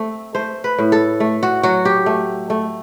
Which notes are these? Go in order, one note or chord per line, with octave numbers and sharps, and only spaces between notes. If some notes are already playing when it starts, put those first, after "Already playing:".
Already playing: A3 C4
A3 C5
B4
A2
A4
A3
F#4
F#3 F#4
G4
A3
A3